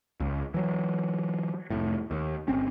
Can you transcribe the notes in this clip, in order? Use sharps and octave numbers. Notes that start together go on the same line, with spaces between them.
C#2
E3 F#3
F1 A2
D#2
G1 C4 C#4